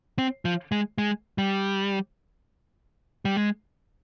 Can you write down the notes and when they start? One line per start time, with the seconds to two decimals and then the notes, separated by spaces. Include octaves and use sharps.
0.18 C4
0.45 F3
0.72 G#3
0.98 G#3
1.38 G3
3.25 G3
3.37 G#3